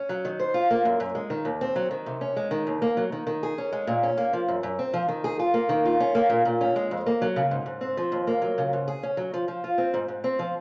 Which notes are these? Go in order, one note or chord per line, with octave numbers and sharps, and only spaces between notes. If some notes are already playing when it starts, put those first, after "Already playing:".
Already playing: C#4
F#3
D#3
C5
F4
A#3
F#2
F#2
G#3
D#3
D#2
C4
F#3
D#3
C3
C#4
G#3
D#3
D#2
A#3
F#3
D#3
D#3
G#4
C#4
G#3
A#2
C#4
A#3
F3
F#2
F#2
C4
F3
D#3
G#4
F4
A#3
D#3
F4
C#4
A#3
A#2
A#2
C#4
G#3
F2
A#3
F#3
C#3
G#2
G#2
C4
F3
D#2
A#3
F#3
C#3
G#2
G#4
C#4
F#3
F3
F3
F4
C4
G#2
G#2
C4
F3